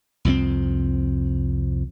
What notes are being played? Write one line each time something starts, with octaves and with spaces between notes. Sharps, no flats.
C2 F2 F#3 C4